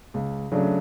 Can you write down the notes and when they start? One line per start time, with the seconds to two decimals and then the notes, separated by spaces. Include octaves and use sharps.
0.14 C#2
0.51 C#3 F#3 A3 D4